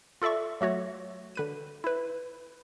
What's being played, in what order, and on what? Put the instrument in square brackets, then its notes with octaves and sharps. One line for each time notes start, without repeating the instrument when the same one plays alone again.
[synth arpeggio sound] F4 A4 D5 E5 C#6
F#3 A3 F#4 C#5
D3 B4 D#7
E4 B4